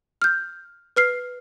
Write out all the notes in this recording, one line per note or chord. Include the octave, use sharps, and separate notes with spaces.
F6 G6
B4 F6 C7